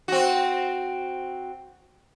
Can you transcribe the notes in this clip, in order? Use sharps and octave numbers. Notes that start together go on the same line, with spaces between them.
C4 F#4